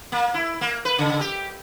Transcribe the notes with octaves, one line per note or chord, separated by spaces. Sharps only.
A#3
E4
A#3
B4
C#3
G4